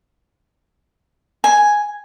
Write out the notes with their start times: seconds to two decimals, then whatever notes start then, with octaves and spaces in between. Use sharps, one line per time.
1.44 G#5